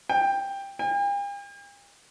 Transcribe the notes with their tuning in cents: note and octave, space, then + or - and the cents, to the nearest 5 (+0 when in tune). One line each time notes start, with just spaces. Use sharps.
G5 +10
G5 +45